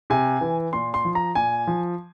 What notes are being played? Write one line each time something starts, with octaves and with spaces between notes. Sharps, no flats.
C3 G#5
E3
A#2 C6
C6
F3
A#5
A#2 G#5
F3